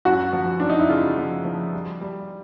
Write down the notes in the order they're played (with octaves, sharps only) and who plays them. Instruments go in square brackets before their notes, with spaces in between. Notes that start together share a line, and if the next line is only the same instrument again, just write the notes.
[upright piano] F#2 F#4
F3
F#2 D4
D#4
E4
C#3 F4
F3
F3
G3
G3